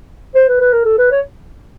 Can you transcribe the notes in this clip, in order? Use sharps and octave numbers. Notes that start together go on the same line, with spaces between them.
C5
B4
B4
A#4
A4
B4
C#5